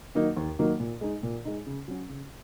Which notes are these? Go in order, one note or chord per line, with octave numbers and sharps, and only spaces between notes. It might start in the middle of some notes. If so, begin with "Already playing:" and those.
D#3 F#3 A#3 D#4
D#2
D#3 F#3 A#3 D#4
A#2
G#3 D#4
A#2
G#3 D#4
C#3
F#3 C#4
C#3